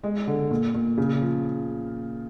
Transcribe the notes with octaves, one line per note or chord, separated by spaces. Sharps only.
G#3
D3
A#2
A#2
C#3
F3